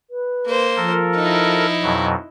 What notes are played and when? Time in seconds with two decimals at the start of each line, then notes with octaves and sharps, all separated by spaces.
0.10 B4
0.47 A#3 C5
0.76 F3 A4 A#4
1.16 D#4 E4
1.82 F2 B2 F#3